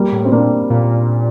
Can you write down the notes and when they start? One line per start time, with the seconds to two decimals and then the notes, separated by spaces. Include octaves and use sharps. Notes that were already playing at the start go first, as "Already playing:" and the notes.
Already playing: G3 A#3
0.12 A2
0.25 C4
0.31 A#2 A#3 D4
0.70 A#2